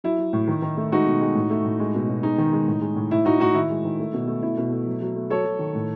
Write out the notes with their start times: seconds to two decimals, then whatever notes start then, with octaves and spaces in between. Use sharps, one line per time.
0.04 F#3 E4
0.18 F#3
0.33 A2
0.47 D#3
0.62 D#3
0.77 A3
0.92 G#3 D#4 F#4
1.06 B2
1.21 G#3
1.35 A2
1.50 A3
1.64 A2
1.80 G#3
1.95 B2
2.09 B2
2.23 G#3 D#4
2.38 D#3
2.53 G#3
2.68 A2
2.81 G#3
2.96 A2
3.11 A2 E4
3.25 A2 D#4 F#4
3.40 A2 D#4 F#4
3.54 D#3 E4
3.70 G#3
3.85 D#3
3.99 A3
4.13 B2
4.28 A3
4.42 B2 E4
4.58 B2
4.72 A3
4.87 F#3
5.02 F#3
5.16 A3
5.30 F#3 A4 C#5
5.46 F#3
5.59 D#3
5.75 A2